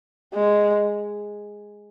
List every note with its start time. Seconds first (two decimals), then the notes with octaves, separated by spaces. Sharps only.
0.34 G#3